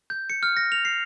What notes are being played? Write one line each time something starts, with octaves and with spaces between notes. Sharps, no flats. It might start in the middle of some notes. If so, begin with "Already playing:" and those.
G6
C#7
F6
A#6
F7
C7